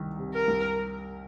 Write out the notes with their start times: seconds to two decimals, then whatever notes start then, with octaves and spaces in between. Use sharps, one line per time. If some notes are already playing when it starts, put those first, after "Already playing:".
Already playing: C2 D#3
0.19 C3
0.34 A#4
0.48 C2